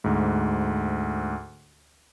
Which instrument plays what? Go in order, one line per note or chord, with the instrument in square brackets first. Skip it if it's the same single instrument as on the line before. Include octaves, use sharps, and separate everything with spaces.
[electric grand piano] D2 G#2